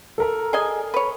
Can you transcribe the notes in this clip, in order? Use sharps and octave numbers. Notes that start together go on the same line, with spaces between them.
A4 A#4 A#5
G#4 D#5 G#5
B4 C#5